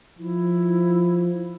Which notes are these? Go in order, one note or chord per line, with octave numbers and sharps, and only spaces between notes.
F3 E4